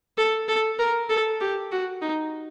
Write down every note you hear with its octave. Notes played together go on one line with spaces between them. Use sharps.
A4
A4
A#4
A4
G4
F#4
D#4